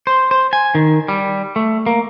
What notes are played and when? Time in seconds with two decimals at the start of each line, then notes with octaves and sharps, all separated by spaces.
0.07 C5
0.31 C5
0.53 G#5
0.75 D#3
1.08 G3
1.56 A3
1.86 A#3